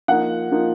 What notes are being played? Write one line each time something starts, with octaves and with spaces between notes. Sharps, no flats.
F3 A#3 D#4 F#5
F3 A#3 D#4